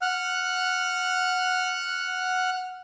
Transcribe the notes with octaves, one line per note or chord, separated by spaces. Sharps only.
F#5 F6 F#6